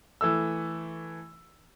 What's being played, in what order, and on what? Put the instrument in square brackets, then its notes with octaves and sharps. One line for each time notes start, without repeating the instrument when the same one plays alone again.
[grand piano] E3 A3 E6